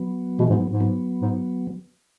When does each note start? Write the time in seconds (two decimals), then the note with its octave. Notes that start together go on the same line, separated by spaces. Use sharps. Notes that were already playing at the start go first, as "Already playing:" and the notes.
Already playing: F#3 B3
0.39 B2 E3 G#3
0.50 G#2
0.53 F#3 B3
0.70 G#2
0.80 F#3 B3
1.22 G#2